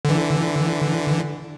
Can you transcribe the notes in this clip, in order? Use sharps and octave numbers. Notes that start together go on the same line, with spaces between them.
D3 E3